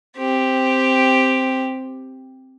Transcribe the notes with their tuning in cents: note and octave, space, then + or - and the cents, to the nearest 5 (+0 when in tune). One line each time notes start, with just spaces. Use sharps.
C4 +0 G4 +5